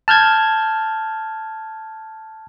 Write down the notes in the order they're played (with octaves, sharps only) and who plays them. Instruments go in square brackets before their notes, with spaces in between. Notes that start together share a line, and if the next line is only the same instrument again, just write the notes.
[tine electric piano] A5 F6 G6 G#6